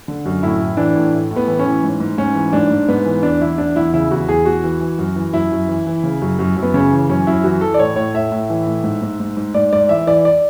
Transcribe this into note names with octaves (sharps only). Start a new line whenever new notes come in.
D3
F#2
A2 E4
A2
E3 D4
A2
A2
A2
B3
E3
C#4
E3
G#2
G#2
G#2 C#4
E3
G#2 D4
G#2
G#2 B3
E3
E2 D4
E2 E4
E2 D4
E2 E4
C#3 E4
E2 F#4
E2 G#4
E2 F#4
E3
E3
F#2
E3
F#2 E4
F#2
E3
E3
C#3
F#2
F#2
F#2
B3
C#3 C#4
E3
F#2 C#4
F#2 E4
E3 F#4
E3 A4
D5
A2 C#5
A2 C#5
A2 E5
A2
E3
A2
G#2
G#2
G#2
G#2
G#2 D5
G#2 D5
E3 E5
E3 D5
D5